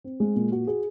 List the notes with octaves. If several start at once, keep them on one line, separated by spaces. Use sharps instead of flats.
C4
G#3
A#2
F#4
G#4